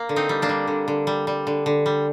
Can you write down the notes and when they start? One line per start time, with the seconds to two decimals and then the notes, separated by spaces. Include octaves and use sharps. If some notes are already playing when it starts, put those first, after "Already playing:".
Already playing: A#3
0.09 D3
0.16 C4 D#4
0.29 G3
0.42 A#3 D4
0.49 G3
0.68 D3
0.88 D3
1.07 G3
1.27 G3
1.47 D3
1.66 D3
1.86 G3